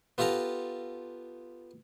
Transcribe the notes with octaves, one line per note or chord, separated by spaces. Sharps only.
B3 F4 G4 A4 A#5